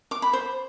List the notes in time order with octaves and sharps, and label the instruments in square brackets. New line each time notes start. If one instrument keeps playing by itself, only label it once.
[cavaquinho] D6
B5
C5